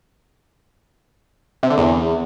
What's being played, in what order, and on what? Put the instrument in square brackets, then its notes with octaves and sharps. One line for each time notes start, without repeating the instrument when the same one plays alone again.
[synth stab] C3
D3
E2